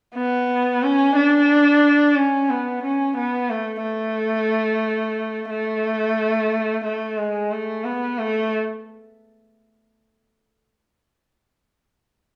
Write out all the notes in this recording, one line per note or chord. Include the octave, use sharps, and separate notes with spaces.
B3
C#4
D4
C#4
B3
C#4
B3
A3
A3
A3
A3
G#3
A3
B3
A3